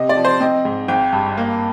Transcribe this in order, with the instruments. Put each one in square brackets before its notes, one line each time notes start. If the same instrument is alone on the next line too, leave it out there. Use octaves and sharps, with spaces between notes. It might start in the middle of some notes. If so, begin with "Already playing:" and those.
Already playing: [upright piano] C3 D#5
D5
F3
C5
C4 D#5
G#2
G#1 G5
G2
A#3